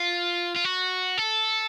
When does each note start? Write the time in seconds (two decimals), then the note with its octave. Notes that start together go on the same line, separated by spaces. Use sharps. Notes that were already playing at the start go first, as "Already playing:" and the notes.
Already playing: F4
0.56 F4
0.65 F#4
1.18 A4